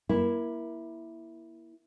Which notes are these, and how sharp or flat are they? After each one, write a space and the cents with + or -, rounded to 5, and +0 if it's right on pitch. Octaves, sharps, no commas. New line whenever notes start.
A#3 +20 E4 +0